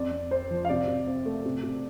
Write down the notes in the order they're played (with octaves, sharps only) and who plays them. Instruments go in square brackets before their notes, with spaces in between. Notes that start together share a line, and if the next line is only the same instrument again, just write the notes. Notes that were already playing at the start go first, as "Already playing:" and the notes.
Already playing: [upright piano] F2 D5
F2
C4 C5
F3
F5
C3 D5
C3
C4
A3
C3
C3